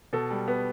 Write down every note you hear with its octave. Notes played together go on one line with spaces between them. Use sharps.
B2 A4
G3
B3